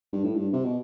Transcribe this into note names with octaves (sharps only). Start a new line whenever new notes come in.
G2
A2
G2
C3
B2